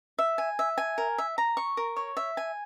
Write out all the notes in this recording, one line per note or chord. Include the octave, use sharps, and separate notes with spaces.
E5
G#5
E5
G#5
A#4
E5
A#5
C#6
A#4
C#5
E5
G#5